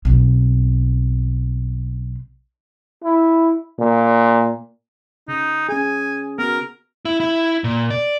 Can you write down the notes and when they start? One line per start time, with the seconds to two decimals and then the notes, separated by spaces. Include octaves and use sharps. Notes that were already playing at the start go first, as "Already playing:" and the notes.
0.05 B1 C4
3.04 E4
3.79 A#2
5.28 C#3 D#4
5.69 C#4 G#4 G#5
6.39 B3 F#4 A#4
7.05 E4
7.20 E4
7.64 A#2
7.90 D5